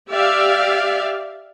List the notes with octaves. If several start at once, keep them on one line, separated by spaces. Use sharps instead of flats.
G4 D5 E5 F5